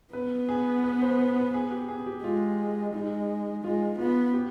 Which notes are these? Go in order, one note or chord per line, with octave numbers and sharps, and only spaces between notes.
B3 B4
G#4
B4
C5
B4
B4
G#4
G4
G#4
G4
G#3 F4
G#3 D#4
G#3 F4
B3 F4
G4